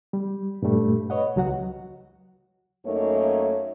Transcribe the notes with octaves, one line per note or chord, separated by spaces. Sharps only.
G3
G2 A#2 G3 A3
B4 C#5 D#5 F#5
C#2 F#3 F#4 F#5
F#2 A3 A#3 D#4 C#5